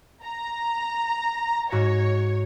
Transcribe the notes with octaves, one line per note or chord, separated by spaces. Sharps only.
A#5
G#2 F#4 C#5 A#6